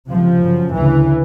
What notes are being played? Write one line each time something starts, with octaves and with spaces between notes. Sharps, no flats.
C#2 C3 F3
F#2 C#3
D2 C#3 E3